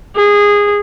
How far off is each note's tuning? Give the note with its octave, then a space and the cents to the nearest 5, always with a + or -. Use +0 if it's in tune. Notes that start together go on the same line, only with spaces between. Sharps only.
G#4 -15